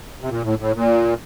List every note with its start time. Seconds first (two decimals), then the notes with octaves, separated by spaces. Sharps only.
0.21 C3
0.29 A#2
0.44 A2
0.59 A2
0.74 A#2